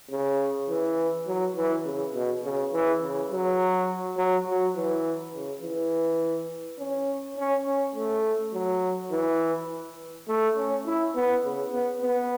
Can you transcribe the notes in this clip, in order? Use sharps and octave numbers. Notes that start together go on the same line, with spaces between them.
C#3
E3
F#3
E3
C#3
B2
C#3
E3
C#3
F#3
F#3
F#3
E3
C#3
E3
C#4
C#4
C#4
A3
F#3
E3
A3
C#4
E4
B3
C#3
B3
B3